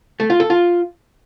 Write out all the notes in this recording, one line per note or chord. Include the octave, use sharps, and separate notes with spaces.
A3
F4
A4
F4